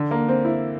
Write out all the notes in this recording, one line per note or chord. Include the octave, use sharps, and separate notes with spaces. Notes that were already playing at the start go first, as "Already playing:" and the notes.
Already playing: D3
A#3
C4
E4